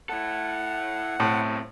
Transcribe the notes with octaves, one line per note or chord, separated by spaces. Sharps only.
E4 A4 F#5
B1 A2 C4